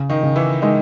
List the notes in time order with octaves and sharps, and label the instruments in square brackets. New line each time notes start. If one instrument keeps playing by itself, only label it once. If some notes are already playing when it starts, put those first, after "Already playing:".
Already playing: [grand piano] C#3
[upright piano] D#3 D#4
[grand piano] C#3
[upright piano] E3 E4
[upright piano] D#3 D#4 [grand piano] G#3